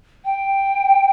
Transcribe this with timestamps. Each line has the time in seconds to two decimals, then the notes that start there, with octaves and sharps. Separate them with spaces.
0.25 G5